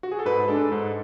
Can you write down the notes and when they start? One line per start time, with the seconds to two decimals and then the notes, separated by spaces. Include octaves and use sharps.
0.03 F#4
0.11 G#4
0.19 A4
0.25 G#2 B4
0.48 G#3 D4 A4
0.72 G#2